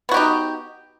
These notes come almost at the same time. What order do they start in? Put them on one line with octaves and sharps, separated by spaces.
B3 F#4 G4 D#4